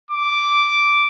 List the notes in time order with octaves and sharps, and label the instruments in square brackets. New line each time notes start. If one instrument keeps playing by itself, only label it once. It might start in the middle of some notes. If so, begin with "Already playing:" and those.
[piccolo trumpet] D6